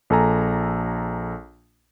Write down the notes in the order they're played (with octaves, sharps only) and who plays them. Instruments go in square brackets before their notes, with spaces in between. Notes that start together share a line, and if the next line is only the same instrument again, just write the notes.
[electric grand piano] A#1 A4 G#5 A#5